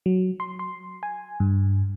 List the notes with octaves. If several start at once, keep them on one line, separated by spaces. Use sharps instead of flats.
F#3
C6
C6
G#5
G2